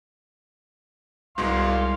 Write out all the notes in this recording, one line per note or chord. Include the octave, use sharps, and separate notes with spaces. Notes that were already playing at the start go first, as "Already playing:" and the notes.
C2 G#2 B2 G#3 F5 C6